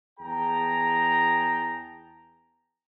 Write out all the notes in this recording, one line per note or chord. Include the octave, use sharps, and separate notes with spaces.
E2 G#4 G5 A5 A#5